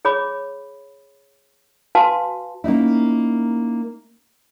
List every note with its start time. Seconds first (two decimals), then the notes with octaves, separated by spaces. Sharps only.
0.05 G#4 C#5 B5 D6
1.95 F#4 B4 F5 G#5 A5 C6
2.64 A#3 C#4 D#4 E4